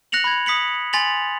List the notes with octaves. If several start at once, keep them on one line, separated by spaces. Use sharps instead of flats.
F#6 A#6 C#7 F7 F#7
B5 G#6
D#6 B6 C#7 F#7
G#5 C6 A6 B6 F7 F#7